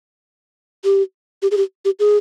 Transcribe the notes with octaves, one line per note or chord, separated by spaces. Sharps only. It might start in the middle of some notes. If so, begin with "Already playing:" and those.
G4
G4
G#4
G4
G4
G#4